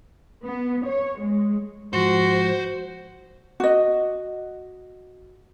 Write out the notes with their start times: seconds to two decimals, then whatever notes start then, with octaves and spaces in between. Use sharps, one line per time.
0.44 B3
0.86 C#5
1.19 G#3
1.93 G#2 F3 F#4 C5
3.60 F#4 D#5